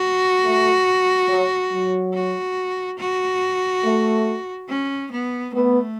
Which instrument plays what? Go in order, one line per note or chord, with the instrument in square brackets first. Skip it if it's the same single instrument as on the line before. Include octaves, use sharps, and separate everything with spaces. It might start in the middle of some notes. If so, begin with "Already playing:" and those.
Already playing: [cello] F#4
[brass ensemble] A3
F#3
F#3
[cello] F#4
F#4
[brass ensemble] A3
[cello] C#4
B3
[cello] A3 [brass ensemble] B3